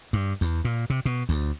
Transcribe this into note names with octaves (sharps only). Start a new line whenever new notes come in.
G2
E2
A#2
C3
B2
D2